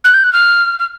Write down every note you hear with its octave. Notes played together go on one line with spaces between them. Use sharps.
F#6
G6
F#6
F6
F6